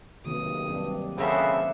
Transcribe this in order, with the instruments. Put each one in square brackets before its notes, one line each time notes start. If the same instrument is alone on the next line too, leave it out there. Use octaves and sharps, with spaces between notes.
[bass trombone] B1 [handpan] C3 D#3 A#3 [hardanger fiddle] D#6
[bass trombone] G2 [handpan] F#3 C4 D4
[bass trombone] C#3 [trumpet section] B3 C4 A4 [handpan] D4 A#4 F#5 [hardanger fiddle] E5